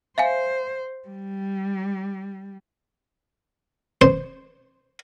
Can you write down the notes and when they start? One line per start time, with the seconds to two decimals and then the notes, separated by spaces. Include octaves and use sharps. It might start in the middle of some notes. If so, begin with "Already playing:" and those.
0.18 C5 E5 F5 G#5
1.08 G3
4.01 C5